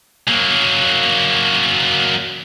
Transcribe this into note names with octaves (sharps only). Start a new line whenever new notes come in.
F#3 A#3